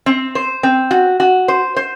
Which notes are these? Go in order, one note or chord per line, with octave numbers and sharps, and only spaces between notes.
C4
C5
C4
F#4
F#4
C5
C5